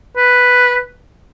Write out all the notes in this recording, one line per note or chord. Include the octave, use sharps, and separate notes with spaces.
B4